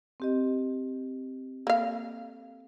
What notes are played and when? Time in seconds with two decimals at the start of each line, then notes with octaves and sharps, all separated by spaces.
0.20 C4 G4 D#5
1.67 A#3 A4 F5